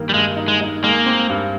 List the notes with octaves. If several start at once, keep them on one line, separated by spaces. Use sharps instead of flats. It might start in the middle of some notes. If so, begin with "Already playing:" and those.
Already playing: G2 D#3 A#3
G3
G2 G#3
D#4
G#3
D#4
G#3 A#3
C4
G2